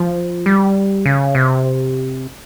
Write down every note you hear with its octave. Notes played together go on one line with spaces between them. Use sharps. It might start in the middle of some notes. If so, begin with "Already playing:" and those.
Already playing: F3
G3
C#3
C3